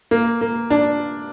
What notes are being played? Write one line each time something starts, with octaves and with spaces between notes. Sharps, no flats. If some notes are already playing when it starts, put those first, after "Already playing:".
A#3
A#3
D4